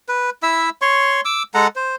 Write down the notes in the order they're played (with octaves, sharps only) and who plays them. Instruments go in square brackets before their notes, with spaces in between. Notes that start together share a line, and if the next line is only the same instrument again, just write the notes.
[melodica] B4
E4 E5 E6
C#5 C6 C#6
D6 E6
G#3 A4 F#5 A#5
C5